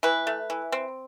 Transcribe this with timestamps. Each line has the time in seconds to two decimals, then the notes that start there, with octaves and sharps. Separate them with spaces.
0.03 E3 B4
0.27 A3
0.50 E3
0.72 C4